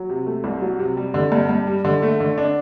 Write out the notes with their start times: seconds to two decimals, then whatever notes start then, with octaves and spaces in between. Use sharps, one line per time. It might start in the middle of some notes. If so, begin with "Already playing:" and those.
Already playing: F#3
0.09 C3
0.27 A3
0.44 C2
0.61 F#3
0.79 C3
0.97 G3
1.14 D3
1.32 G2
1.49 G2
1.67 G3
1.85 D3
2.02 A3
2.20 D3
2.38 D4